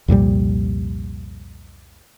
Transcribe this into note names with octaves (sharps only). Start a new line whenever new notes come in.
C2 F2 A#2 G3